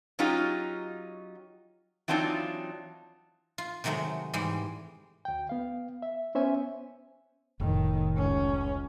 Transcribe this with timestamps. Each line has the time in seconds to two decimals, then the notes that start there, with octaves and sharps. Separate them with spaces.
0.19 F#3 C#4 D#4 F4 G4
2.08 E3 F#3 C4 D4 D#4 F4
3.58 F4
3.84 C3 D#3 F#3 G#3 A3
4.34 G#2 E3 G3 G#3
5.25 D2 G5
5.49 B3 F5
6.02 E5
6.35 B3 C#4 C5 E5 G#5
7.60 F1 A2 D#3
8.16 C#2 C#4